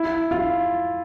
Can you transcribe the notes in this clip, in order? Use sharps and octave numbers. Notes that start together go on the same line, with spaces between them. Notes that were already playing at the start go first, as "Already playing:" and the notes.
Already playing: E4
F4